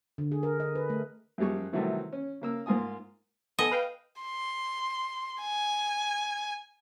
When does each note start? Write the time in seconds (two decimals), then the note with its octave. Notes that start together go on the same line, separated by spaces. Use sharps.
0.18 D3
0.32 G#4
0.43 A#4
0.60 D#5
0.75 B4
0.90 A3
1.38 F#2 F3 G3 G#3 C#6
1.73 C3 D#3 E3 F#3 G3 A3
2.13 C#4
2.42 C#3 A#3 E6
2.66 G#2 A#3 F4 G#5 D#6
3.59 B3 A4 D#5 G#5
3.71 B4 F5 G5
4.22 C6
5.42 G#5